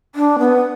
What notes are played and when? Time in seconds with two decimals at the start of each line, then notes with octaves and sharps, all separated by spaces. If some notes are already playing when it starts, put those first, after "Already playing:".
0.15 D4
0.39 B3